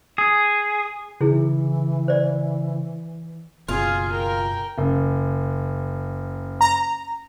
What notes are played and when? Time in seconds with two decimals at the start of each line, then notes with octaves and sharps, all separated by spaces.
0.18 G#4
1.21 C#3 E3 D#4 E4 G#4
2.08 C5 D5
3.69 F#1 B2 F4 G#4
4.12 A#4 G5
4.78 F#1
6.61 A#5